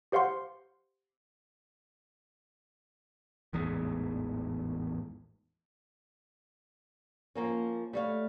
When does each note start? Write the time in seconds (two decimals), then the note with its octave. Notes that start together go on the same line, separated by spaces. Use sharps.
0.12 G4 C5 F5 F#5 C6
3.53 A1 E2 G#2
7.35 F3 A#3 C#4
7.93 G3 A3 C#5 F5